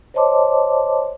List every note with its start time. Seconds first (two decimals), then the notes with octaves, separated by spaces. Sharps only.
0.14 C5 C#5 D#5 A5 C6 D6